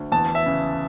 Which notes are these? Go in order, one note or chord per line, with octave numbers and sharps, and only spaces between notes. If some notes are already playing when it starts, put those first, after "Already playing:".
Already playing: D2
E2 A5
E5
C#3